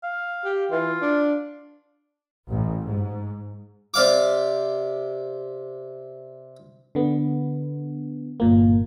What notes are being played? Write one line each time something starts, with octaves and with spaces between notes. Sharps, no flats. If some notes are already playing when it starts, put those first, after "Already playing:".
F5
G4
E3 F4
D4
A1
G#2
C3 D5 F5 D6
D3 B3
G1 A#2 A#3